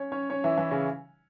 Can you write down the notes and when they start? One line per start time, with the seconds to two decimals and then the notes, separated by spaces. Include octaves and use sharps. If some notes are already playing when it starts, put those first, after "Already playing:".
Already playing: C#4 C#5
0.12 C#4 C#5
0.30 C#4 C#5
0.44 E3 E4
0.58 E3 E4
0.71 C#3 C#4